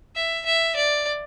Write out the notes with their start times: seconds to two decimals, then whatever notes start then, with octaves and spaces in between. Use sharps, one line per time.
0.16 E5
0.46 E5
0.76 D5